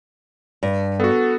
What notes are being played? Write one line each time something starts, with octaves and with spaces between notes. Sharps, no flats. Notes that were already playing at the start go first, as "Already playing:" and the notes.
G2
B3 F#4 A4